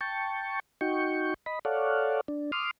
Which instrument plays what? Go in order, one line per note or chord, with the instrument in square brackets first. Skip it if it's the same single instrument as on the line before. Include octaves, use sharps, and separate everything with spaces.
[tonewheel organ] G5 A5 C#6
D#4 F#4 G5 C#6
D#5 B5
A4 C#5 D5 F5 F#5
D4
C6 D6 D#6 F6